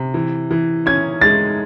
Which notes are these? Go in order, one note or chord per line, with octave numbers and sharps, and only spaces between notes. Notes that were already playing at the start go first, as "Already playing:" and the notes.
Already playing: C3
E3
E3
C#4 G#6
G#3 A6